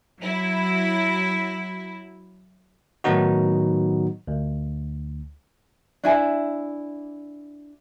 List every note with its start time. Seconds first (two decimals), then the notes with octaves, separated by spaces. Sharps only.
0.20 F#3 E4
3.04 A2 D#3 F#3 B3 D#4 F#4
4.27 D2
6.04 D4 E4 G#5